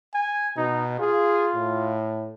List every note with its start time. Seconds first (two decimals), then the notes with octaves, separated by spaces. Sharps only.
0.14 G#5
0.57 B2 D#4
0.99 F4 G#4
1.55 A2